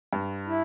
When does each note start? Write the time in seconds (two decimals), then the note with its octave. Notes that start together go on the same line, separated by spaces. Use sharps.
0.13 G2
0.47 E4